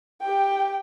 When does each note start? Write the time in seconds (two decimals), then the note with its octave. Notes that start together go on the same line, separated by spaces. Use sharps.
0.22 G4 G5